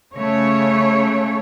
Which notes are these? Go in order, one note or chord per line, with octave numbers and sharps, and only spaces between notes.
C#3 A3 C#5